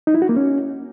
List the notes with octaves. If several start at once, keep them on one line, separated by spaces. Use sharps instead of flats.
D#4
E4
F#4
A#3
C#4